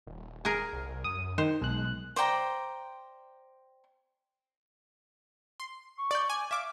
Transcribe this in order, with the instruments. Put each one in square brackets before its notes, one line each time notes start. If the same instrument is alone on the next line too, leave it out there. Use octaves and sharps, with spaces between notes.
[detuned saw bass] D#1
[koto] G#4 A#4
[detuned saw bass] C2
[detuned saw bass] F#2 [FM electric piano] D#6
[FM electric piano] D#3 [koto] C5
[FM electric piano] B1 F#6 [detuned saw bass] G#3
[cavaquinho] C5 D5 G5 A#5
[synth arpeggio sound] C6
[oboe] C#6
[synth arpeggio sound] D5 G6
[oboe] D5 [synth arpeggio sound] G#5
[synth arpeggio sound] E5 D6 [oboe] F5